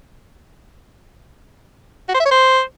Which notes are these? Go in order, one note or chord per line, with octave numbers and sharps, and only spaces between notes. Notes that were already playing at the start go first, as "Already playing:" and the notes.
F#4
C5
E5
C#5
C5